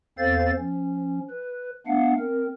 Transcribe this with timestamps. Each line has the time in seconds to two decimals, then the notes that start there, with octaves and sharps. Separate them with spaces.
0.18 E2 C4 A4 C5 F5 A6
0.58 F3 C#4
1.30 B4
1.87 A3 B3 D4 F5 F#5
2.19 C4 A#4